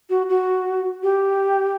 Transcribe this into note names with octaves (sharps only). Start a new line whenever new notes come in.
F#4
F#4
G4